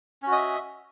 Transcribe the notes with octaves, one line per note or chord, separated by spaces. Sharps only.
C#4 F#4 D#5 E5